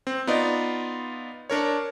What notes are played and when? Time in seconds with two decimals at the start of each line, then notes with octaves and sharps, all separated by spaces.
0.07 C4
0.27 B3 D#4 F4 D5 D#5
1.50 D4 A#4 C#5